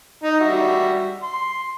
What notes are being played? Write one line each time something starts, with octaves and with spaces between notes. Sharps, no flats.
D#4 D#5
G3 F#4 E5
C6